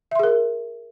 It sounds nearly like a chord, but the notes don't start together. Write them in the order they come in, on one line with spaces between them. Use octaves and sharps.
E5 C6 G#4 A#4